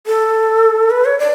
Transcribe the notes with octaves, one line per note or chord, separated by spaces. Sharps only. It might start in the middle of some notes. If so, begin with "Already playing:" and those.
A4
B4
C#5
D5